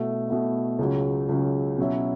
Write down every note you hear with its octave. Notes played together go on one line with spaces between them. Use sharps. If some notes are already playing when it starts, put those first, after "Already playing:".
Already playing: B2 A3 E4
B2 A3 E4
C#2 C#3 F#3
C#2 C#3 F#3
B2 F#3 C#4 E4